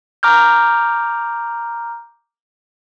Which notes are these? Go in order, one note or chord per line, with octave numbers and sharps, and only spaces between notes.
A#5 D6 F6 G6